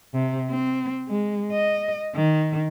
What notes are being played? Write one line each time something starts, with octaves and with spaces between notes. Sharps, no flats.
C3
C4
G#3
D#5
D#3